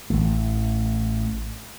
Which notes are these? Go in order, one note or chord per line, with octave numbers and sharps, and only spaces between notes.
A1 E3 A3